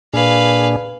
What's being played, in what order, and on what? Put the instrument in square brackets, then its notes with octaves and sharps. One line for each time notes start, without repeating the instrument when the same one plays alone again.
[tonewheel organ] A#2 D4 G#4 [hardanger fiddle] B4 F5